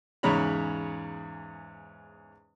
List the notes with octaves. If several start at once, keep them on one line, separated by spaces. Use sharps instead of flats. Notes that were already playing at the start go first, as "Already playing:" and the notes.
E2 G#2 C#3 C#5 A#5 B5